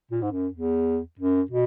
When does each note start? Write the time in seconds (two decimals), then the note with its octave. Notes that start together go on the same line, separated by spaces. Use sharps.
0.11 A#2
0.22 G#2
0.32 F#2
0.54 E2
1.19 F#2
1.51 B2